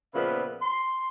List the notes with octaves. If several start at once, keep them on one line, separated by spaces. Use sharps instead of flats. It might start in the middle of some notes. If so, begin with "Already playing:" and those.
A#2 C#3 F3 B3 B4 E5
C6